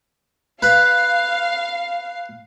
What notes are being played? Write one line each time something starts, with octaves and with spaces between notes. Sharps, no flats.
B4 F5